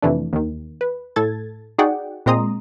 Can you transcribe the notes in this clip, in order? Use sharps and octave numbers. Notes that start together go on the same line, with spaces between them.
F2 C3 E3 A3 D4
D#2 D#3
B4
A2 A4 G#6 A6
D#4 F#4 G#4 D5 F#5 G5
A#2 G#3 C4 A#5 C6 D#6